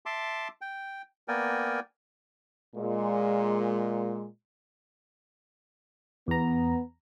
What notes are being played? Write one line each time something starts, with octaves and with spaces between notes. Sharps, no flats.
E5 A5 C6 D6
G5
A#3 B3 A#4 D5 G5 G#5
A#2 G#3
E2 B3 A#5